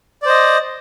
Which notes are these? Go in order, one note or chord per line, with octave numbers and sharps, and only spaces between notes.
C5 D5 D#5